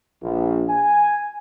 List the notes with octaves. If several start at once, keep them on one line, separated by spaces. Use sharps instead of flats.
A#1
G#5